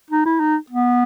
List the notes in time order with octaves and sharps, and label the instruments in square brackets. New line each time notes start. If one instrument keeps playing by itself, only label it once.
[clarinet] D#4
E4
D#4
B3